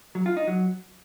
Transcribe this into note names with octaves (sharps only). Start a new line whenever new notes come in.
F#3
F4
D#4
F#3